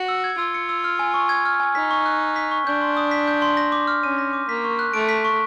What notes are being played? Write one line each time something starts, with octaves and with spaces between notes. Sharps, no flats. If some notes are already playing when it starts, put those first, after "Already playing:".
Already playing: F#4 C#7
E6
G#6
F4 E6
C#7
E6
F6
G#5
C#6
G#6
F6
G#5
D#4 B6
C#6
F#6
C#6
B6
C#6
D4 G6
C6
D#6
B6
G6
C6
A#6
D6
F6
C#4 D#7
A#6
D6
A#3 B6
C#6
F#6
A3 D7
B6
C#6